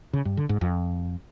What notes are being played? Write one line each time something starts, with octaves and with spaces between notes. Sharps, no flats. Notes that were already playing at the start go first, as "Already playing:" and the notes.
C#3
G2
D3
G#2
F2